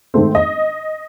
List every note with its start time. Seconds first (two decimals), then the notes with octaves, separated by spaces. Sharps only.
0.14 G#2 D#3 A3 C4
0.35 D#5